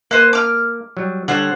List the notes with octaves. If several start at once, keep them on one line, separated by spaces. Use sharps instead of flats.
A#3 B4 C5
D6 F6
F#3 G3
D3 G3 C5 C#5 F#5